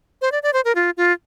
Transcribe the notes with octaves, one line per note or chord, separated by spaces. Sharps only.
C5
D5
D5
C5
A#4
F4
F4